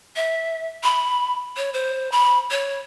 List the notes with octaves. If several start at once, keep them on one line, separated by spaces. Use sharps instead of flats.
E5
B5
C#5
C5
B5
C#5